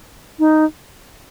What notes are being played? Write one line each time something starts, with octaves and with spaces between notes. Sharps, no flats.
D#4